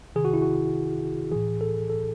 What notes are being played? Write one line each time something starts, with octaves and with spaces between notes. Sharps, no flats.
C3 D#3 G#4
F#4
E4
F#4
A2 E3 G#4
A4
A4